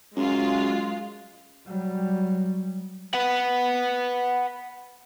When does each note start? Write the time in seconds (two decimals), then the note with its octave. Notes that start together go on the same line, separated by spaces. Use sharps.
0.16 F#2 G#3 F4
1.67 F#3 G3
3.14 B4 F#5